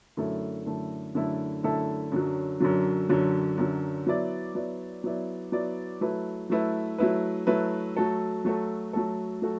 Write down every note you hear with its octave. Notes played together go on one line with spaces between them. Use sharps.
F#2 D3 A3 E4 A4
F#2 D3 A3 E4 A4
F#2 D3 A3 E4 A4
F#2 D3 A3 E4 A4
F#2 D3 F#3
F#2 D3 F#3
F#2 D3 F#3
F#2 D3 F#3
F#3 B3 E4 D5
F#3 B3 E4 D5
F#3 B3 E4 D5
F#3 B3 E4 D5
F#3 A3 E4 B4
F#3 A3 E4 B4
F#3 A3 E4 B4
F#3 A3 E4 B4
F#3 A3 F#4 A4
F#3 A3 F#4 A4
F#3 A3 F#4 A4
F#3 A3 F#4 A4